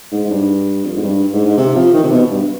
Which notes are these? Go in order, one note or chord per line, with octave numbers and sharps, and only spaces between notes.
G#2
G#2
G2
F2
G#2
G2
G#2
G#2
C3
F3
D#3
C3
B2
G2